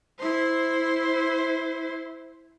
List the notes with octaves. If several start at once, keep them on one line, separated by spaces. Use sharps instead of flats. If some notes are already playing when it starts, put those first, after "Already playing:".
E4 C5